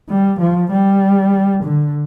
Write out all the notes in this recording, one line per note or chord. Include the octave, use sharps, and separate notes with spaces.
G3
F3
G3
D3